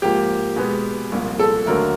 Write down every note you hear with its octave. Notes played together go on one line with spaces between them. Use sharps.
G#2 F3 A#3 G4
B2 G#3 B3
C2 A#2 F3
A4
D#2 D3 F#3 A3 A#4